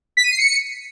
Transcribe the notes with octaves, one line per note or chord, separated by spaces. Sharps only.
B6
D#7
C7
C#7